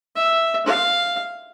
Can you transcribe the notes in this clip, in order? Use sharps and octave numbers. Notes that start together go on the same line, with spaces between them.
E5
F5